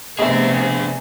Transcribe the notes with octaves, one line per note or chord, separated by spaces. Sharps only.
C3 G#3 A3 B3 D4 G#4 E5